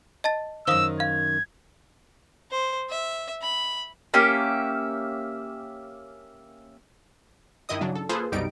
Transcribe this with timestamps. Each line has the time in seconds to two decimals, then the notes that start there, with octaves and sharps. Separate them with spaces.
0.24 D#5 A5 A6
0.67 F#2 D#3 C5 F5 D#6 E6
1.00 F5 G#6
2.51 C5
2.90 E5
3.42 B5
4.14 A#3 C#4 G4 E5
7.69 G2 D#3 E4 D#5 D#6
7.81 C#3 F#3 D4
7.95 A4
8.09 A#3 F4 G#4 A4 B4 C5
8.32 C2 F#2 B2 G3 D#4 D7